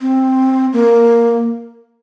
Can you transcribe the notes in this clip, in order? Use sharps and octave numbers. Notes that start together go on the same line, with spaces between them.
C4
A#3